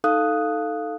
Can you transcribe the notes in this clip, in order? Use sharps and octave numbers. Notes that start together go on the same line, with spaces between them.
D#4 A4 F5 D#6 F#6